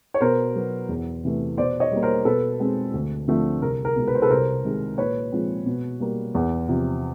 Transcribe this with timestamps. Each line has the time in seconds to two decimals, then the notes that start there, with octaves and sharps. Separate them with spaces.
0.14 C#5
0.21 B2 A#4 C5
0.56 F#3 B3
0.89 E2
1.24 C3 E3 A3
1.57 B2 C5 D5
1.80 C#5 D#5
1.92 G3 A#3
2.02 A#4 C5
2.25 B2 A4 B4
2.60 G#3 C4
2.93 D2
3.28 D3 F3 A3 C4
3.62 C2 A#4
3.85 A#4
3.96 B2 G#3
4.07 B4
4.15 C5
4.22 A4 B4
4.30 C2 A#4 C5
4.64 C3 D#3 G#3
4.98 A#2 B4 C#5
5.32 F3 G#3 C4
5.66 B2
6.00 G3 A#3
6.35 E2
6.69 C3 F3